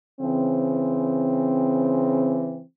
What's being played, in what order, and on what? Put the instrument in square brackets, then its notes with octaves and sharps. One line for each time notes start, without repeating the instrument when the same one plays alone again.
[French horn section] C#3 E3 C4